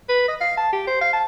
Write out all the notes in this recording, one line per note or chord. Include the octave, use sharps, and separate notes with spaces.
B4
D#5
F5
A5
G4
C5
F5
A5